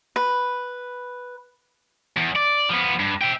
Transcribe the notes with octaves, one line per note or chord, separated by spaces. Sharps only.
B4
E2
D5
F3 B3
G2
E5 G5